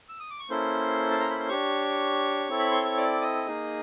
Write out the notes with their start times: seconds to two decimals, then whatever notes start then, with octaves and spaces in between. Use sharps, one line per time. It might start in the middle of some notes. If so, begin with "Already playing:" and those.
0.09 E6
0.20 D#6
0.30 D6
0.39 C#6
0.50 A#3 C#4 E4 A4 C5 C6
1.11 A5
1.20 A#5
1.30 B5
1.40 C6
1.49 D4 G4 C#5 C#6
2.49 C4 E4 A4
2.59 B5
2.71 C6
2.85 C#6
2.97 D5 D6
3.22 D#5 D#6
3.47 A#3 D#4 G#4